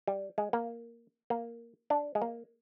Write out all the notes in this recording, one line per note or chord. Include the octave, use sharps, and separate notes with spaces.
G3
G#3
A#3
A#3
D4
G#3
A#3